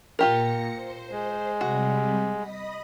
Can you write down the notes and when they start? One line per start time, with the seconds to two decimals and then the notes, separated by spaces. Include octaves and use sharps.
0.19 A#2 F4 G4 A#4 A#6 C#7
0.73 C5
1.11 G#3
1.61 C3 G3 F#4
2.37 D#5 B5 D#6